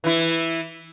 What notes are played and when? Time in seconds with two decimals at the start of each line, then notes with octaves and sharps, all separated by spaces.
0.04 E3 E4